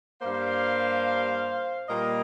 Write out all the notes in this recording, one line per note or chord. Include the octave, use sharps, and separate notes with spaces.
G2 G3 A#3 C5 F5
A#2 G3 A#3 A#4 D#5